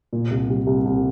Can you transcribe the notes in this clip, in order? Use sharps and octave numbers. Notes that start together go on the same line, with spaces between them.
A#2
C2
G3
C2
C2